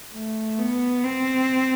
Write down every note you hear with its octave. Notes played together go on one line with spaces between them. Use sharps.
A3
B3
C4